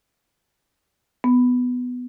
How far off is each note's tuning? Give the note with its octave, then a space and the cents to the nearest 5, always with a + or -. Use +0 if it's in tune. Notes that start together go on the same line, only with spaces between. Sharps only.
B3 +5